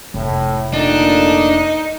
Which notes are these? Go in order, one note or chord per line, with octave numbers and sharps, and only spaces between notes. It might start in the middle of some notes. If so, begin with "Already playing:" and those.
F1 A2
A#2 D3 A3 D4 D#4